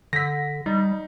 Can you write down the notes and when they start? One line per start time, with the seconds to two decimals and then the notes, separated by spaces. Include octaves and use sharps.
0.13 D3 A#6 B6
0.66 G3 D#4